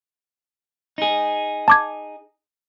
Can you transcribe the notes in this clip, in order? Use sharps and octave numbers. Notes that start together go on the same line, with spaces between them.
D#4 G#4
A5 D6 G#6